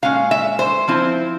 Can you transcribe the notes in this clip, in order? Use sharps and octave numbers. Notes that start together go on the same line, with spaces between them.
A#2 G#3 C#4 F5
E5
C5
F3 C4 E4